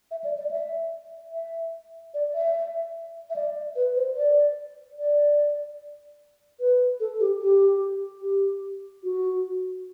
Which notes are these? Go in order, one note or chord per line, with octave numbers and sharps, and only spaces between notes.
E5
D5
D5
E5
E5
D5
E5
E5
D5
B4
C5
D5
D5
B4
A4
G4
G4
G4
F#4